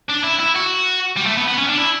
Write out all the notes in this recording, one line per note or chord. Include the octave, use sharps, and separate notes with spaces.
D4
E4
E4
F#4
G3
A3
B3
B3
C#4
D4
E4